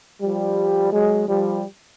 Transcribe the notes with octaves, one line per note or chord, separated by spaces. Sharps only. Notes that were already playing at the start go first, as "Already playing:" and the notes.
F3 G3
F#3 G#3
F3 G3